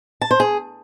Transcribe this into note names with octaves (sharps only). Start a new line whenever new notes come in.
A5
C5
G#4